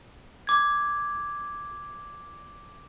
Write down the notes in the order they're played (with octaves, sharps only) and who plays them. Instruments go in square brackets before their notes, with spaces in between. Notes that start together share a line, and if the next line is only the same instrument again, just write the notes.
[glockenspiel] D6 G#6